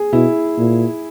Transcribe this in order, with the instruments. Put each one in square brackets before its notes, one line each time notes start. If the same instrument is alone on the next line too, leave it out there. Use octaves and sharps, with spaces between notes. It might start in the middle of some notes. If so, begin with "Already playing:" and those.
Already playing: [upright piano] G#4
[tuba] B2 [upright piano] E4
[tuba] A#2